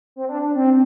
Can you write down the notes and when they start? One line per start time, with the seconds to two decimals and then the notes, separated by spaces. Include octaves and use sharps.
0.16 C4
0.29 D4
0.42 D4
0.56 C4